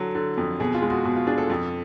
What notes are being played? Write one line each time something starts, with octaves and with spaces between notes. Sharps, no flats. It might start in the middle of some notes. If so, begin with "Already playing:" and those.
Already playing: D3 F#3 A4
D3
F2
B2 G#4
F4
G#3
F#4
B2 G#4
F4
D4 G#4
A4
F2